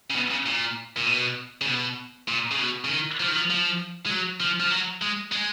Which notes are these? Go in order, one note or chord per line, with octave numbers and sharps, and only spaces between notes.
C#3
B2
C#3
A#2
A#2
B2
C#3
B2
A#2
C#3
B2
C#3
D#3
F3
D#3
F3
F3
G#3
F#3
F3
F3
F#3
G#3
G#3